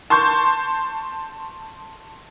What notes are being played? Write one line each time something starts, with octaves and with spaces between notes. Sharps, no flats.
A5 C6 C#6 G6